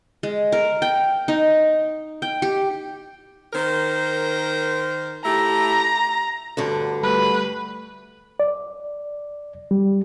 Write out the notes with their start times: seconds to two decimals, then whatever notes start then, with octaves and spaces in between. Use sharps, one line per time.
0.23 G#3
0.52 A#4
0.82 G5
1.28 D#4
2.22 G5
2.42 G4
3.53 D#3 A#4 C5
5.24 A3 E4 G4 A#5
6.57 D2 G2 D3
7.03 G3 A3 B4
8.40 D5
9.71 G3